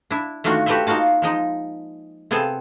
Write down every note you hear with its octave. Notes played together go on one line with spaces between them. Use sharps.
D4 E4
D#3 A3 A#3 D4 F4 F#4
F#4 G4 A4 B4 C5 E5
A#3 D#4 F4 F#4 A5
F3 G#3 D#4
C3 B3 C4 G#4 A4